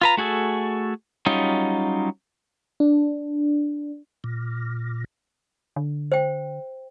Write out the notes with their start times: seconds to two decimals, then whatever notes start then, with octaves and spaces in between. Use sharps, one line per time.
0.01 F4 B4 A#5
0.17 A3 F#4 G#4 A4
1.26 F#3 G3 C#4 D#4 F4
2.80 D4
4.24 A#2
5.76 D3
6.12 C5 G5